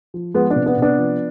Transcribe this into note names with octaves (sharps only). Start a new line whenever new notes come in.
F3
F3 G#3 B3
B3 D4
C3
B3 D4
C3
B3 D4
F3